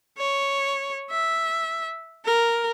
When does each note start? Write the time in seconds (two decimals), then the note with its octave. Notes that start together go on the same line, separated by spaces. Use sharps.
0.18 C#5
1.10 E5
2.25 A#4